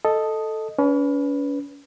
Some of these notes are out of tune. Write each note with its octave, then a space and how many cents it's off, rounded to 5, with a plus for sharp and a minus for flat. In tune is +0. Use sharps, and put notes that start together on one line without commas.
A4 +0 D#5 +0
C#4 +40 B4 +0